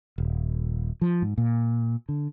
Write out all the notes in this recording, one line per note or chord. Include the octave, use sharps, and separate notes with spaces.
D#1
F3
G#2
A#2
D3